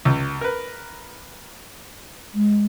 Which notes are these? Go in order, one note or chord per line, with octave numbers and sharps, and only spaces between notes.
C#2
A#4 B4
G#3